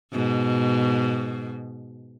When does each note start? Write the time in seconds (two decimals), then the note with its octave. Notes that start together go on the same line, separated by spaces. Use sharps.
0.13 G#2 B2